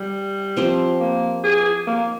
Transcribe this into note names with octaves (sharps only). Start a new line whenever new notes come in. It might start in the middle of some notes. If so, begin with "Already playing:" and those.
Already playing: G3
F3 C4 G4 C5
A#3
G#4
A#3